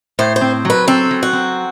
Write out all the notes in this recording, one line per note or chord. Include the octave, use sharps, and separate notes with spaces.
A2 C5
C5
C4
F#3 B4
C4 A4
F#3
F#4
C4